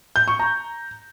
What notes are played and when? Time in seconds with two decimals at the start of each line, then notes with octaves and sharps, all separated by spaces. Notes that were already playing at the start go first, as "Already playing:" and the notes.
0.16 G6
0.28 C#6
0.39 A#5